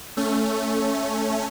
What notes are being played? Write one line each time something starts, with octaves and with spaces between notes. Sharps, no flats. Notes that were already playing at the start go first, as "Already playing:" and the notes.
A3 C#4